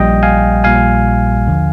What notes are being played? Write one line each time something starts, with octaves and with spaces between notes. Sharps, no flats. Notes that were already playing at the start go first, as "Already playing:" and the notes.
Already playing: A#1 A#2 G3 D#5 G5
F5 G#5
A#1 A#2 G3 F5 G#5
D#2 D3 F3